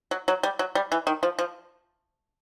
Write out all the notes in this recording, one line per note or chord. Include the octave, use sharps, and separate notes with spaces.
F#3
F#3
G3
F#3
G3
E3
D#3
F3
F3